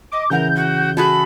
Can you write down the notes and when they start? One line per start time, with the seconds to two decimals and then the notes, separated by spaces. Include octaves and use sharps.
0.12 D#5 D6
0.30 C#3 E3 A#4 F#5 G6
0.54 F#4
0.97 F#4 G#4 A4 B5